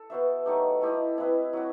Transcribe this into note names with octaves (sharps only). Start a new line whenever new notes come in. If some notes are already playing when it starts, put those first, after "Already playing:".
Already playing: A4
B3 F#4 C5 E5
F#3 A3 D#4 G4
A3 E4 G4 D#5
C4 E4 B4 D#5
F#3 C4 F#4